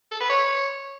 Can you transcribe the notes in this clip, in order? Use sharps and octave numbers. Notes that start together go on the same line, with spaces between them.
A4
B4
C#5